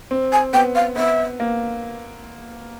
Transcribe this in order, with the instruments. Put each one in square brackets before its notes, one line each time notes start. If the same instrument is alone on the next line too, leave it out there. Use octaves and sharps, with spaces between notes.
[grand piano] C4
[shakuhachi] G#5
[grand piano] B3 [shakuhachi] G5
[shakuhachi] F5
[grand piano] B3 [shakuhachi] E5
[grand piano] A#3